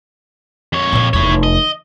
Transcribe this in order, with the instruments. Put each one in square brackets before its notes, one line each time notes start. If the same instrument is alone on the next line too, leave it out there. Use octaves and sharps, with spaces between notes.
[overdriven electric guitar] F2 C#5
[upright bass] A#2 C4
[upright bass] F1 E2 [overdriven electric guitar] E4 C#5
[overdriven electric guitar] D#5